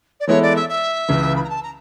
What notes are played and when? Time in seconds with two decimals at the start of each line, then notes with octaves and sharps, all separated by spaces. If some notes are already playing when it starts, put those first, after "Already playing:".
0.20 D5
0.27 E3 G#3 B3 E4 A4 C#5
0.42 D5
0.55 E5
0.69 E5
1.09 C#2 C#3 E3
1.35 B5
1.43 A#5
1.49 A5
1.62 A#5